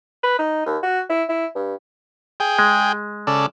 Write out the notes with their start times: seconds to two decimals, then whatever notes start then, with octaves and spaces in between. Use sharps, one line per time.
0.23 B4
0.39 D#4
0.66 D#2
0.83 F#4
1.10 E4
1.29 E4
1.55 G2
2.40 G#4 G5
2.59 G#3
3.27 C#3 A4 D5